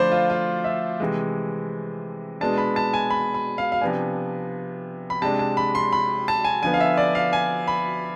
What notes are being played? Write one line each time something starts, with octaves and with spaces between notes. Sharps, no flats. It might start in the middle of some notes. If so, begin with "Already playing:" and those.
Already playing: D3 F3 A3 D4 C5 D5 B5
F4
F4
E5
C3 E3 G#3
B2 G#3 B3 D4 A5
B5
A5
G#5
B5
B5
F5
F5
C3 F3 B3 D4 G#5
B5
C3 G#3 D4 A5
A5
B5
C6
B5
A5
G#5
D3 F3 B3 G#5
F5
E5
D5
F5
G#5
B5